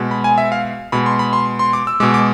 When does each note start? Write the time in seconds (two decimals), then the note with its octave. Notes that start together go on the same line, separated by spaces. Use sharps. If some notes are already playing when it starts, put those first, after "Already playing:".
Already playing: B2 G#3
0.11 B5
0.24 G#5
0.38 E5
0.52 F5
0.92 B2 G#3 B5
1.06 C6
1.19 B5
1.33 C6
1.59 C6
1.73 D6
1.87 E6
2.00 B2 G#3 D6
2.14 D6